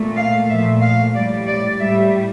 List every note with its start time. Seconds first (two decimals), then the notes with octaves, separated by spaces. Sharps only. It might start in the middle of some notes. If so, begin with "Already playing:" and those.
Already playing: A#2 A3
0.16 F5
0.48 A#2 F3 A3 E5
0.81 F5
1.14 A2 G3 D5
1.47 D5
1.80 A2 G3 E5